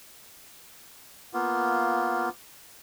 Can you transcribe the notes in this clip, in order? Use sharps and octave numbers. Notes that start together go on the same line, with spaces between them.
A#3 B3 F4